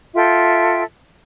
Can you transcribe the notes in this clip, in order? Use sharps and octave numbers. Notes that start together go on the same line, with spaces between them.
F4 A4 E5 G5